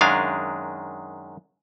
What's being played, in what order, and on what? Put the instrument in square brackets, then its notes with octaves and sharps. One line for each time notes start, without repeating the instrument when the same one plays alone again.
[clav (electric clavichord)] F#2 D#3 G#3 D4 F5